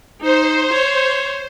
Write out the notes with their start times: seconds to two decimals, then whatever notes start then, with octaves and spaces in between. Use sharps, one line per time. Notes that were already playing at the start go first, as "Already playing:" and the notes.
0.22 D#4 C5
0.74 C#5